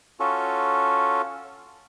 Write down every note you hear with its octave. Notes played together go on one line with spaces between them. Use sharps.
C#4 F4 F#4 A4